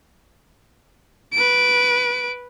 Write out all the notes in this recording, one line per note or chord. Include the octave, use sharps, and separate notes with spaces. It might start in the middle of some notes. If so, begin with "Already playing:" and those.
B4 D7